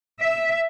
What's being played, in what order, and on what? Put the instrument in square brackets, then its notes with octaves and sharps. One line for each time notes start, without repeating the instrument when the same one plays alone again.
[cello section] E5